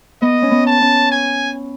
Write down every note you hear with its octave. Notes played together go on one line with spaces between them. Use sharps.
B3 D#5
C#4
B3
A5
C#4
G#5